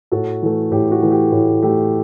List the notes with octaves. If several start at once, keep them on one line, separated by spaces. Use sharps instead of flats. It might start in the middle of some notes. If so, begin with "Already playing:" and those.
A2 F#4 A4
E3 A3
A2 G4
F#4
E3 A3
G4
A2
E3 A3 G4